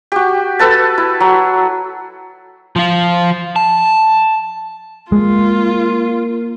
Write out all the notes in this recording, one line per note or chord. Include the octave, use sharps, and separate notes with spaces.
F#4 G4
A4 B4 A5
E4
F#3
F3 F4
A5
G#3 A#3 F4